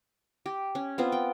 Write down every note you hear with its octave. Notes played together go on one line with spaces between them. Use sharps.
G4
C#4
B3 C4 F4
G5